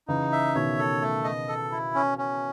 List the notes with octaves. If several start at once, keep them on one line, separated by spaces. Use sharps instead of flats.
C#3 E3 D#4
E5
B2 D#3 C#5
A4
A3
D#5
A4
E4
C#4
C#4